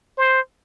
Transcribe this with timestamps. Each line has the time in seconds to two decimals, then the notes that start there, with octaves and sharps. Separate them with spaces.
0.18 C5